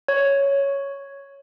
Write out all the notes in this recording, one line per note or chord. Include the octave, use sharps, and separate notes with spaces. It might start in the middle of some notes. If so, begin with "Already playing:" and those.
C#5